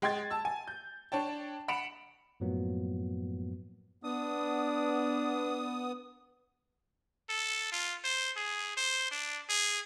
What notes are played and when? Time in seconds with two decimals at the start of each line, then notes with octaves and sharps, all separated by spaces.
0.02 G#3 G5 C6 G#6 A6
0.30 A5 E6
0.45 G#5
0.67 G6
1.12 D4 C#5 G5 A5
1.68 F#5 B5 C#7 D7 E7 F7
2.40 F#2 A2 F3 F#3 A#3 B3
4.04 B3 D4 D#6
7.29 A4
7.72 F4
8.04 C5
8.37 G#4
8.77 C5
9.11 D4
9.49 G#4